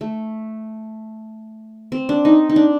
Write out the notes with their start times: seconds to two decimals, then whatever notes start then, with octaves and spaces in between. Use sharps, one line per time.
0.01 A3
1.92 C4
2.09 D4
2.25 D#4
2.49 D#4
2.56 D4